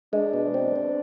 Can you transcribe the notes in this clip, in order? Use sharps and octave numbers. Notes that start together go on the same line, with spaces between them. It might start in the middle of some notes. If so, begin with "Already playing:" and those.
G#3 D4
B2
C4
C4